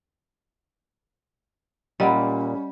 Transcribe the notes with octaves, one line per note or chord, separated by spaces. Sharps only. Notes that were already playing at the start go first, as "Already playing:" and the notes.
A#2 G3 C#4 D#5 F#5 B5